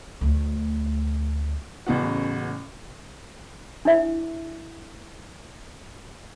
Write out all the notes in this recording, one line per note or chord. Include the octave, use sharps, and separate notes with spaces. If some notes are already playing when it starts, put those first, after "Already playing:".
D2 A3
A1 C#3 B3 F#4
D4 E4 E5